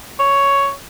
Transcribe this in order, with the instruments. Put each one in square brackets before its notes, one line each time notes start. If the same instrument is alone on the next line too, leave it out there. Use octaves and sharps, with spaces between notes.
[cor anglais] C#5